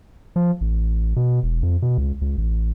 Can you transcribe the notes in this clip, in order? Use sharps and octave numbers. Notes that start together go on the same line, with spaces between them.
F3
A1
B2
E1
F2
B2
C#2
C#2
A1